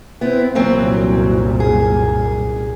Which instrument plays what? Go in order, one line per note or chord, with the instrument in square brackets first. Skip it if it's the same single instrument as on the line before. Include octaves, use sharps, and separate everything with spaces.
[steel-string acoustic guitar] B3 E4 [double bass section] C4
[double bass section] C2 F#2 A#2 [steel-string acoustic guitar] E3 F#3 C4
[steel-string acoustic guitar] G#4